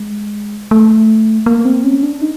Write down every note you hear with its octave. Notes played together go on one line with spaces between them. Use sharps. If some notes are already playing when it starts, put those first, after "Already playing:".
Already playing: G#3
A3
A#3
C4
C#4
D4
D#4